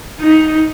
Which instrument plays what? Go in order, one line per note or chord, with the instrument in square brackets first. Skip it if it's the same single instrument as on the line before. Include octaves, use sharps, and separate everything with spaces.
[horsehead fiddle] D#4